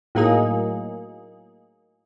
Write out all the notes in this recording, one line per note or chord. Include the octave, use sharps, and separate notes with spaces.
A2 F#3 A#3 D#4 G#4